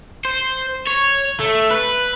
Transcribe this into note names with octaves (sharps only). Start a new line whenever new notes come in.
C5
C#5
A3
B4